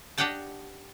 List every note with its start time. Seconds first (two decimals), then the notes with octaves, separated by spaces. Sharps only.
0.18 D4 G4 D#5 F#5 G5 A5